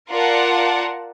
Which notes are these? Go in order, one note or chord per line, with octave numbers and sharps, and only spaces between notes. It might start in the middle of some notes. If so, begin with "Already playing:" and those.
F4 A#4 D5 F#5 A5